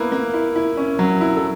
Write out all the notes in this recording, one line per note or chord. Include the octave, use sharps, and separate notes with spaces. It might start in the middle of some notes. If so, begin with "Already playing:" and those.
Already playing: A#3 B3 E4 B4
A#3
E4
E4
C#4
F#3
E4
A4